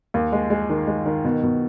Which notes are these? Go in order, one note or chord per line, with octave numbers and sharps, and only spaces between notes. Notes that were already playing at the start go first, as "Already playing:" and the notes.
D#2
G#3
G#3
D#3
G#3
D#3
B2
B2